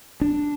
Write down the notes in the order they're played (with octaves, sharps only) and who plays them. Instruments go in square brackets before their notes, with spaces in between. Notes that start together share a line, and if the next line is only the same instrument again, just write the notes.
[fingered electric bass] D4